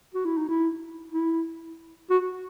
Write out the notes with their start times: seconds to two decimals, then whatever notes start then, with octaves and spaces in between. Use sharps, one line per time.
0.14 F#4
0.25 E4
0.38 D#4
0.49 E4
1.12 E4
2.10 F#4